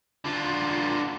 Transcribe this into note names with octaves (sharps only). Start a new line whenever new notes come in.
D3 F4